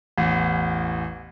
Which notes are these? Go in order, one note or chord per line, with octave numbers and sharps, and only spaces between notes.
A1 E2